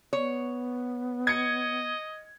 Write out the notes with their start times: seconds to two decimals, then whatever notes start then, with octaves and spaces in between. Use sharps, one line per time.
0.13 B3 C#5
1.27 D#5 G#6 C#7